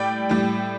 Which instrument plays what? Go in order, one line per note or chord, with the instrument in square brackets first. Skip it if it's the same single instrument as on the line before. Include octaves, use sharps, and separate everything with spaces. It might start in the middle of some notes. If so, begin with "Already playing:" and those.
Already playing: [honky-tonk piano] A2 G3 D5 G5
A2 G3